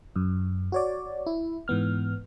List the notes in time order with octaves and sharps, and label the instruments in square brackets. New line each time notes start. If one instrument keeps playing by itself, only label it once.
[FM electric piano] F#2
F#4 C#5 D5
E4
G#2 E3 B3 F6